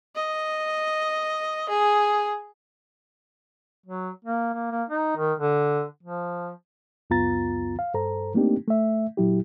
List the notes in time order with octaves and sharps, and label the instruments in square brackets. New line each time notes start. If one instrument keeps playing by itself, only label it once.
[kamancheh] D#5
G#4
[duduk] F#3
A#3
A#3
A#3
D#4
D#3
D3
F3
[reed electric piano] C#2 F#2 B3 F4 A#5 A6
F5
G2 A4 C5 A#5
A3 A#3 C4 D4 D#4 G4
A3 E5
A#2 F#3 E4 G4